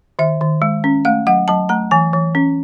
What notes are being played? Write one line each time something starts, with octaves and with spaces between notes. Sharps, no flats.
D#3 E5
D#3
G#3
C#4
A3 F5
F#3 F#5
F#3 A5
A3 A#5
E3 G#5
E3
C#4